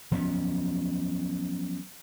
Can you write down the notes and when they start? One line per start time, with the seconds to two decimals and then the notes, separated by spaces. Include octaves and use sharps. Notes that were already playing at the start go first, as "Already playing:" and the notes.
0.12 F3 F#3 B3 C#4